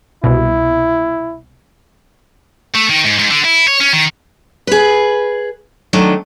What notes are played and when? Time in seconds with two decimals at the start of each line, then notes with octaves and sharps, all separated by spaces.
0.24 C2 B2 E4
2.74 A3
2.89 D#3
3.04 G#2
3.19 G#2
3.31 D3
3.44 E4
3.68 C#5
3.80 C#4
3.92 D#3
4.67 G#4 B4
5.93 D#3 F#3 A3 D4 D#5